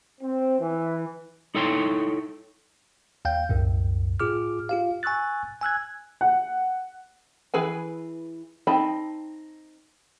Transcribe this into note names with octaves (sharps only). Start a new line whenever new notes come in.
C4
E3
D#4 E4 A4 C#5 G5 C6
D#2 F5 G5 G6
C2 F#2 A2
A2 F4 G#4 D6 F6
F4 G4 F5
G#5 C#6 E6 F#6 A6
G#5 E6 F#6 G#6
F#5
E3 G#4 B4 G#5
C4 D#4 A5 B5